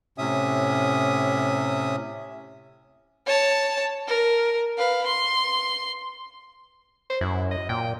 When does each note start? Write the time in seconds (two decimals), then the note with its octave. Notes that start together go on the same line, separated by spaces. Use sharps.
0.18 A2 C3 C#4 E5 D#6
3.26 C#5 A5
4.08 A#4
4.78 B4 F5
5.06 C6
7.09 C5
7.21 F#2 E4
7.51 D#5
7.69 A#2 G5